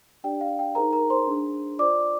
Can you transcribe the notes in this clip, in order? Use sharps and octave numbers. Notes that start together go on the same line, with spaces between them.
D4 G4 D5 G5
F5
G5
D#4 G#4 A#4 C5 A#5
A#4 A#5
C5 C6
D4 G#4 C5
F4 C5 D5 D6